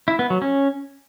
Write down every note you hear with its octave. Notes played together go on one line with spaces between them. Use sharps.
E4
B3
F#3
C#4